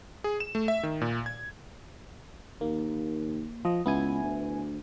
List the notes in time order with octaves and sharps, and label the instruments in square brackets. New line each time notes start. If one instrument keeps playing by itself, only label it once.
[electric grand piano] G#4
E7
A3
E5
D#3
A#2
G#6
[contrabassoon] D#2 [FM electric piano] A#3
[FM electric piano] F3 D#5
[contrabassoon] C#2 [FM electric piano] B3 E4 G#5
[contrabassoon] D2